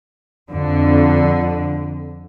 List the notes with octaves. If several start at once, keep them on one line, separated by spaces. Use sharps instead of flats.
F2 D3